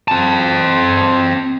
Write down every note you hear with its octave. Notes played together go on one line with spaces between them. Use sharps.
C4 A5